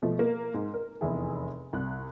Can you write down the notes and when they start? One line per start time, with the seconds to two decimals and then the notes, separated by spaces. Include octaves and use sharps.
0.02 B2 F3 A3
0.19 A#3
0.54 G#2
0.74 A#4
1.01 F1 E2 E4 G#4
1.73 C2 F#6